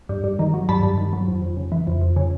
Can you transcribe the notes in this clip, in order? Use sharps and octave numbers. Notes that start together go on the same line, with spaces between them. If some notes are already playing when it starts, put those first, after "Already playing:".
G2
G2
D#3
F#3
G2 A5 B5
G2
D#3
F#3
F2
F2
C#3
E3
F2
F2
C#3